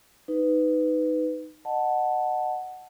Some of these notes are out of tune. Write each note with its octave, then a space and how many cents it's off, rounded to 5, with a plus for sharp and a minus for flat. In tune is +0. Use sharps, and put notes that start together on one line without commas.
D#4 +0 B4 +15
D#5 -25 F#5 +0 A5 +0